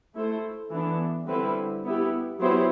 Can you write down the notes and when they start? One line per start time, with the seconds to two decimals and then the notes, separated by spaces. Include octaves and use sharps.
0.15 A3 E4 A4 C5
0.71 E3 B3 D4
1.27 D3 G3 C4 E4 B4
1.84 B3 E4 G4
2.40 F#3 B3 E4 G4 C5